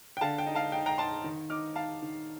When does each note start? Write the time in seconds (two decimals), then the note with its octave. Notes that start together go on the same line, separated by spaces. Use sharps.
0.17 G5
0.21 D3 F5 A5
0.38 G5
0.46 D#4
0.55 F5 A5
0.72 D#4 G5
0.86 G5 A#5
0.98 D#4 A5 C6
1.24 D#3
1.50 D#4 D6 F6
1.76 D#4 F5 A5
2.02 D#3